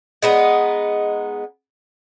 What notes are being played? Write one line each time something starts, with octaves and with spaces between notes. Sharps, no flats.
G#3 B3 D#4